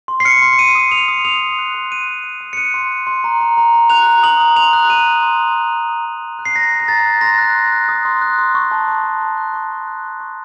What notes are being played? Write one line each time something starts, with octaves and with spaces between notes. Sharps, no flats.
C6
C7
F6 C#7
C6
C#7
C6 D#7
D#6
D#6 F7
D#6
D#6 F7
D#6
F#6
C6
F#6 D#7
C6
C6
D#6
C#7
F#6 D#7
C6
F#6
C6
A#5
A#5
A#5
A#5
F#6 F7
A#5
D#6 F#7
A#5
C6 F7
F#6
D#6 D#7
C6
C6
C6
F#6
C6
D#6
A#5
A#5
F#6
C7
A#5 A#6
D#6
A#6
A#5 A6
F#6
C6 A#6
F#6
C6
F#6
D#6
C6
F#6
C6
C#6
A5
C#6
A5
C#6
F#6
C#6
A5
F#6
C#6
C#6